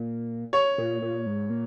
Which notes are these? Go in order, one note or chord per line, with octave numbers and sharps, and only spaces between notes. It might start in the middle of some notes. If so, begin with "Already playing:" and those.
Already playing: A#2
C#5
A#2
A#2
G#2
A#2